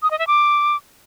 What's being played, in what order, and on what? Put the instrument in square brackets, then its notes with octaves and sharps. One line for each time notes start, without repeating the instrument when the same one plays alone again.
[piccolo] D#6
D#5
E5
D6